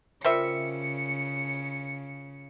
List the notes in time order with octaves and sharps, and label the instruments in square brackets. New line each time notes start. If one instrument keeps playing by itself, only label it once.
[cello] C#3 [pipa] G3 C5 E5 [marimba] F4 A#4 [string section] C#7